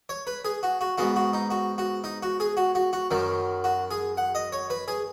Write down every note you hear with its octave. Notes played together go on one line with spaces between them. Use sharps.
C#5
B4
G#4
F#4
F#4
G#2 G#3 B3 F#4
F#4
D#4
F#4
F#4
D#4
F#4
G#4
F#4
F#4
F#4
F#2 D#3 F#3
F#4
G#4
F#5
D#5
C#5
B4
G#4